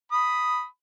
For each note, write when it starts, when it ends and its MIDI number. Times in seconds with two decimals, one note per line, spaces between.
0.12 0.65 83
0.12 0.65 87